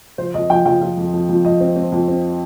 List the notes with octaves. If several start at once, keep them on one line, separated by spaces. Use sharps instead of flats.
F3 C5
F2 D#5
F3 G5
F3 G5
F3
F2
F2
F2
F2 D#5
C4
C4
F2
C4